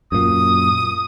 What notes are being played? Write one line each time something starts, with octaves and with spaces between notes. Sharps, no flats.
F#2 A#2 D#6